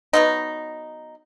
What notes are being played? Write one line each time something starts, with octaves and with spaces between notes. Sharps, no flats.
F#3 B3 D#4